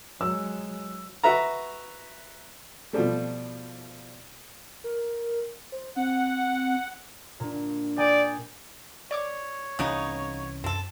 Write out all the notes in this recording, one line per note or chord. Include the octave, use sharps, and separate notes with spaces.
F#3 G#3 E6
F#4 B4 E5 A#5
B2 F3 G3 A3
A#4
C5
C4 F#5
A#2 D4
D5 G5 G#5 D#6
C#5 D5 C#6 D6
C2 C#3 E3 B3 C#4 D#4
F#2 C4 A4